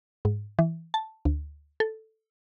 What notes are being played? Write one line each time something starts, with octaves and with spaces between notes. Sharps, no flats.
G#2
E3
A5
D2
A4